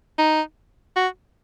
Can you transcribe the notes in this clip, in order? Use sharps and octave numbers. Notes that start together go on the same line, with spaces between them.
D#4
F#4